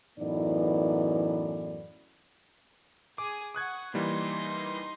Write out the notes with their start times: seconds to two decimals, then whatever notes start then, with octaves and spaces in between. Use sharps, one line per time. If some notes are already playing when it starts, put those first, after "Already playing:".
0.19 F#2 A2 E3 B3 D#4 D5
3.18 G#4 G#5 D6
3.55 F#5 C#6 D#6 F#6 G#6
3.94 E3 G3 A#3 D#4 C6